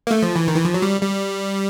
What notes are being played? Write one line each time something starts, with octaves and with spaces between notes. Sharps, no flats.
A#3
A3
F3
E3
D#3
E3
F3
F#3
G3
G3